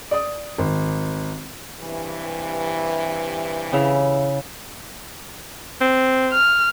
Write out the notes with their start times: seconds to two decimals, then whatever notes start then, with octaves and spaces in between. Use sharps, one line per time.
0.11 D5 D#6
0.58 G#1
1.80 G2 C3 E3
3.73 C#3 E4 F5
5.81 C4
6.32 F6